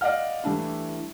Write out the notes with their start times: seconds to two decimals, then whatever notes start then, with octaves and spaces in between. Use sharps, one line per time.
0.01 D5 D#5 F5 F#5 F6
0.44 E3 G3 A3 D4 E4